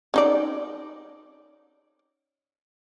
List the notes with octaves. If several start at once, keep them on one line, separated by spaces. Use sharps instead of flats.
C#4 D#4 D5